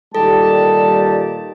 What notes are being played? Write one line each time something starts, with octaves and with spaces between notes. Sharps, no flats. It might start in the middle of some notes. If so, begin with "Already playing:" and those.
A#2 D#3 G3 G4 A4 A5